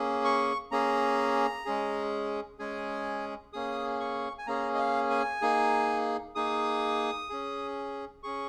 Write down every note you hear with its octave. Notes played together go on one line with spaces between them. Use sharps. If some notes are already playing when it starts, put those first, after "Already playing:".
Already playing: A#3 C#4 G#4
C#6
A#3 C#4 G#4 A#5
G#3 C#4 G#4
G#3 C#4 G#4 G#5
A#3 C#4 G#4 D#6
C#6
G#5
A#3 C#4 G#4 A#5
D#5
F5
G#5
A#3 D#4 G#4
A#3 D#4 G#4 D#6
C#4 G#4
C#4 G#4 C#6